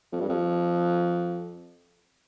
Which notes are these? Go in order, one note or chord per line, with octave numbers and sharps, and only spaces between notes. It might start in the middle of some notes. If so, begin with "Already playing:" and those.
F2
G2
F2